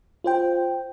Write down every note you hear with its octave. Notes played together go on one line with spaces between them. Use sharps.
F4 C5 G5